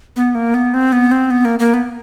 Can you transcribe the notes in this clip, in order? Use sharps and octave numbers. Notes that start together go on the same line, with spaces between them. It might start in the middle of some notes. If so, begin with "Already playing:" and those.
B3
A#3
B3
C4
B3
C4
B3
A#3
A#3
B3